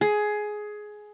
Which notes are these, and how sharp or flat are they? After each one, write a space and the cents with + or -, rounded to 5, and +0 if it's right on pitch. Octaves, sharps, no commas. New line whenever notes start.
G#4 +15